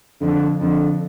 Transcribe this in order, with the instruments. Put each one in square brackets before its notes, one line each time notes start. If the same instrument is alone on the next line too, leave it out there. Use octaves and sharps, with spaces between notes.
[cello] F2 [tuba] D3
[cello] F2 [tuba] D3